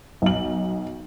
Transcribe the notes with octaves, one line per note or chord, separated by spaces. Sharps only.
B1 F#7